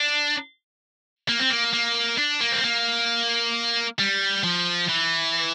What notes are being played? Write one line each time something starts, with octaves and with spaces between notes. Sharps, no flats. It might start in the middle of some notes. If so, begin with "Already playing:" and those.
Already playing: D4
A#3
C4
A#3
A#3
D4
A#3
C4
A#3
G3
F3
E3